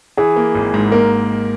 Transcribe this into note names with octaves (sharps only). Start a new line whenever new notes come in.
E3 G#4
A#3
G#1
G#2
A#3 A#4